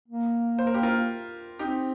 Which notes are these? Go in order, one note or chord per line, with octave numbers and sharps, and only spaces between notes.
A#3
C5
A#4
G4 C5
F4 A#4
C4 D#4 G4